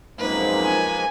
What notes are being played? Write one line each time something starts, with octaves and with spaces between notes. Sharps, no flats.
F#2 F3 G#3 A#3 C4 D#4 B4
G#5